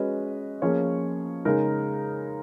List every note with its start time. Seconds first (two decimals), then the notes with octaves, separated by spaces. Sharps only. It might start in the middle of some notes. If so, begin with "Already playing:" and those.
Already playing: G#3 C#4 F#4 B4 D#5
0.62 F3 A#3 C#4 G#4 C#5
1.45 C#3 G#3 D#4 A#4